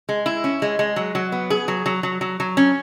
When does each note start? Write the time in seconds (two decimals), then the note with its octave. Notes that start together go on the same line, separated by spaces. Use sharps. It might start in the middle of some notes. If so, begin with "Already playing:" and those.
0.09 G#3
0.26 E4
0.44 C#4
0.62 G#3
0.79 G#3
0.96 F#3
1.15 F#3
1.32 B3
1.50 G#4
1.68 F#3
1.86 F#3
2.03 F#3
2.21 F#3
2.40 F#3
2.57 C#4